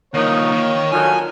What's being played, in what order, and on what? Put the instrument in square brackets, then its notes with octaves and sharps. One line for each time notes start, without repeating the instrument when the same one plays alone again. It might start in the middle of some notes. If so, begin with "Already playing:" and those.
[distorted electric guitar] D#3 F3 [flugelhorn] A#3 [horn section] D#4 [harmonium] C#5
[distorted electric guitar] D#3
[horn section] D3 D#3 F#3 [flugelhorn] F4 [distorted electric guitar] G#5